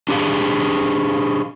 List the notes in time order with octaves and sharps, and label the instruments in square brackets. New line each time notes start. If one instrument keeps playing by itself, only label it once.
[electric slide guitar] D4 G4 G#4 F5